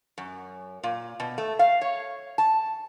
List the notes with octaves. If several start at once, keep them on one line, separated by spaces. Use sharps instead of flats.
F#2
A#2
B2
A3
F5
C#5
A5